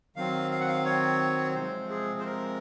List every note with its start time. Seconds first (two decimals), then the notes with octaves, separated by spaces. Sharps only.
0.16 D#3 F#3 C4 F5
0.51 F5
0.60 F#5
0.68 F5
0.85 C#5
1.55 C3 F3 G#3 C4 C5
1.90 G#4
2.20 C5
2.25 A#4